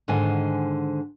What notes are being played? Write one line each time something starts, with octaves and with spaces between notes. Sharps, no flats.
G#2 D3 D#3 C5 G#5